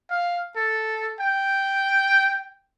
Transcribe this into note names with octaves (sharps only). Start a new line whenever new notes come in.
F5
A4
G5